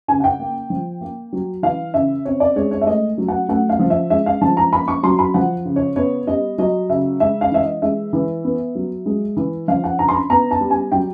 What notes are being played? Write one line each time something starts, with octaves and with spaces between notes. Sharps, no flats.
C#3 G#5
F#5
G5
A#3
F3
A#3
F#3
E3 F5
C#3 E5
C4 C#5
D5
G#3 C#5
C#5
E5
A3 D#5
F#3
F#5
A3 F#5
F5
F3
E5
G#3 E5
F5
F3 A5
A#5
A#3 B5
C#6
F#3 C6
B5
F3 F#5
C#3
C#5
B3 C#5
G3 D#5
F#3 D#5
C#3 E5
G#3 E5
F5
E3 E5
D#5
G#3 E5
E3
B3
F#3
G#3
E3
F3 F5
F#5
D3 A#5
C6
B5
B3 A#5
A5
G3
G#5
F#3 G5